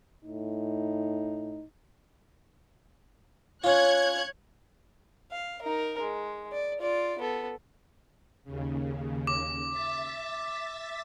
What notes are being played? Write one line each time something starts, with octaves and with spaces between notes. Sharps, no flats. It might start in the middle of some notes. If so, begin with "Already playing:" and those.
A2 D#4
C#4 F4 C#5 F#6 G#6
F5
D#4 A#4
G#3
D5
F4 D5
B3 A4
D#2 C#3
D6
E5 A6 B6